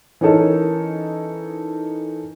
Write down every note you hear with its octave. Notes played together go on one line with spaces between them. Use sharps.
E3 C#4 D#4 A4 A#4